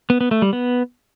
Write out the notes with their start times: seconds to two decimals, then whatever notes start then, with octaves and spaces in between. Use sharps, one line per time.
0.10 B3
0.21 B3
0.31 A3
0.42 G3
0.53 B3